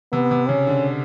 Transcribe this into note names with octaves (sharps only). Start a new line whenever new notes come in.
C3 B3
C3
C#3 C#4
D3